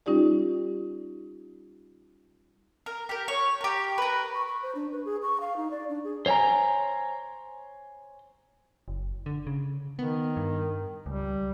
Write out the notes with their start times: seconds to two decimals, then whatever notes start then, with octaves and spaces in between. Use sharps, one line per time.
0.06 G3 C#4 D#4 F4 G4 D5
2.86 A#4
3.09 G4 A#4
3.28 C#5
3.61 G4 A#4
3.98 A#4 B4
4.34 C#6
4.47 C#6
4.62 C5
4.75 D4
4.92 B4
5.05 G#4
5.23 C#6
5.40 F5
5.56 D#4
5.71 D5
5.89 D4
6.04 G#4
6.26 C5 C#5 G5 G#5 A#5
8.88 F#1
9.26 D3
9.47 C#3
9.99 D#3 B3
10.37 G2
11.06 C#2 G3